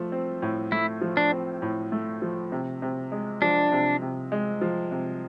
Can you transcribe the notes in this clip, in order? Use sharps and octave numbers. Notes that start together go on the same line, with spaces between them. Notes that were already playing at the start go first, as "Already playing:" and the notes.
Already playing: F3 A3
C4
A2
A3 E4
F3
D4
C4
A2
A3
F3
C3
C3
G#3
F3 D4
C3
C3
G#3
F3
C3